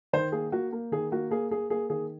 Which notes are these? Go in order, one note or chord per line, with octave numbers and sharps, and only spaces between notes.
D#3 C5
A#3 G#4
A#3 F#4
A#3
D#3 G#4
A#3 F#4
A#3 G#4
A#3 G#4
A#3 G#4
D#3 G#4